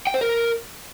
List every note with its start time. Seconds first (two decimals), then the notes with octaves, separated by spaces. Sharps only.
0.07 G5
0.14 C5
0.21 A#4